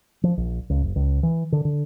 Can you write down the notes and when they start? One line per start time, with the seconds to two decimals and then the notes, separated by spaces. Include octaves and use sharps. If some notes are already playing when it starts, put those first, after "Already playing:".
0.23 F3
0.37 A#1
0.70 C#2
0.82 F#1
0.96 C#2
1.23 E3
1.52 D3
1.65 D3